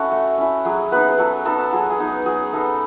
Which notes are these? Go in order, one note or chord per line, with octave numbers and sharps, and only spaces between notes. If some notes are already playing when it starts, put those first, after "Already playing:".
Already playing: C#4 E4 F#4 A4
A3
C#4 E4
F#3 G#4
B3 D#4 B4
G#4
F#3 A4
B3 D#4 A4
F#3 G#4
G#4
B3 D#4
F#3 G#4
B3 D#4 A4